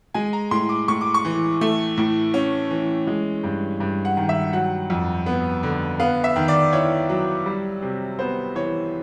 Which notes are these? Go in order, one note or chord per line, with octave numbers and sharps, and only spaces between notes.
G#3 G#5
A#5
A2 C6
D6
A2 C#6
D6
C#6
E3
A3
A2
C#4
E3
G#3
G2
G2
F#5
D#3
E5
F#3 F#5
F2
B3
D3
B3 F5
E5
D#3
D5
E4 C#5
F#3
G3
C3
B3 C5
E3 C#5